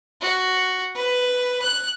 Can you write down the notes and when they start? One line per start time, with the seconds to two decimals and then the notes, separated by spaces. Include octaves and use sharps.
0.21 F#4
0.96 B4
1.62 F#6